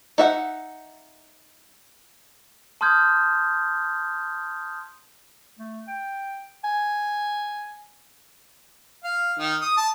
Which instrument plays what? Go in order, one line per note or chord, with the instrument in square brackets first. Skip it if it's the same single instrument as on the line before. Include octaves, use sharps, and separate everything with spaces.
[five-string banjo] D#4 E5 F#5
[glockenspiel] A5 C6 D#6 F6 G6 G#6
[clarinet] A3
G5
G#5
[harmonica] F5
D#3
D#6
A5